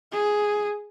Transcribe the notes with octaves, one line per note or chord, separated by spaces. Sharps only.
G#4